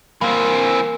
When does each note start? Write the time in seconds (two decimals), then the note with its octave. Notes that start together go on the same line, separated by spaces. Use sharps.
0.21 E3 A#3 C4